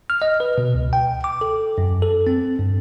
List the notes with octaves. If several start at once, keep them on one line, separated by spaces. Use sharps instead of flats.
F6
D#5
B4
B2
C#2
G5
D6
A4
F#2
A4
C4
G2